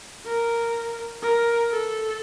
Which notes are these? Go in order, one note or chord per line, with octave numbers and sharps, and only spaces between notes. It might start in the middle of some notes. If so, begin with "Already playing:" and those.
A#4
A#4
A4